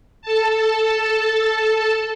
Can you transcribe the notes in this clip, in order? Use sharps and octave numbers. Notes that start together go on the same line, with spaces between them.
A4 A5